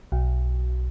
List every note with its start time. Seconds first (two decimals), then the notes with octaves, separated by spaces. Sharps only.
0.12 B1